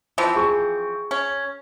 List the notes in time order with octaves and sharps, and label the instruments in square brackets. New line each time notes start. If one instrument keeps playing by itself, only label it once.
[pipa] E3 F3 C4
[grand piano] G#4 C#6
[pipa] C#4